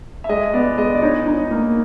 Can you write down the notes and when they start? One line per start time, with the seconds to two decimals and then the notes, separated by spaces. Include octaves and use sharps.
0.24 E5
0.29 G#3 D#5
0.53 B3 D5
0.78 G#3 D#5
0.95 D5
1.02 D#4 C#5
1.26 D#4
1.51 A#3